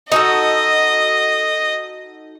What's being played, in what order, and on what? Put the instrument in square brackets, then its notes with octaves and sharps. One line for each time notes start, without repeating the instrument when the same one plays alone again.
[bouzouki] D#4 F#4 A4 [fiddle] D#5